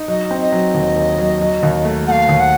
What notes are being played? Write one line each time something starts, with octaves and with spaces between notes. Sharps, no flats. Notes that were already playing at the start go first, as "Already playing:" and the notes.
Already playing: D#4
F#3 D#5
C4
D#5
F#3
D#2
D#2
F#3
F#3
D#2
A3
A3 F5 F#5
D#2
F#5